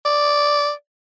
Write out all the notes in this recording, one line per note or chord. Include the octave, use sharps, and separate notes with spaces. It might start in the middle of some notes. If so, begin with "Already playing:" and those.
D5